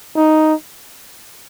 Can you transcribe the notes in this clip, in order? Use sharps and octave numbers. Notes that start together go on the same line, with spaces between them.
D#4